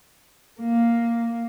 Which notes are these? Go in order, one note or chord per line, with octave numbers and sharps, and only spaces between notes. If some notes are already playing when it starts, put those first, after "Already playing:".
A#3